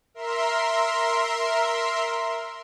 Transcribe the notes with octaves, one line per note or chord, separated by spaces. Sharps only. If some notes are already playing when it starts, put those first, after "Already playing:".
A#4 E5 C6